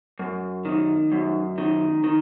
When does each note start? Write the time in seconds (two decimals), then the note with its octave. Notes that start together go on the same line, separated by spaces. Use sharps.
0.19 F#2
0.65 D#3
1.12 F#2
1.58 D#3
2.04 D#3